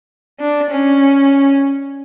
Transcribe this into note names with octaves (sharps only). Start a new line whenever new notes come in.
D4
C#4